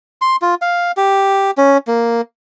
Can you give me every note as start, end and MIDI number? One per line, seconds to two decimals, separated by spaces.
0.22 0.36 84
0.42 0.55 65
0.62 0.92 77
0.97 1.51 67
1.58 1.78 61
1.87 2.21 58